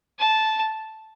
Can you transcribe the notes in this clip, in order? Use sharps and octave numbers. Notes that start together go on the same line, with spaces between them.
A5